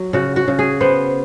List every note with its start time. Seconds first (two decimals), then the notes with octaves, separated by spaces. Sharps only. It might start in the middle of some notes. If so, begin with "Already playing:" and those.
Already playing: F#3
0.13 C#3 F#4
0.36 F#4
0.48 C#3
0.59 G#4
0.81 B3 C5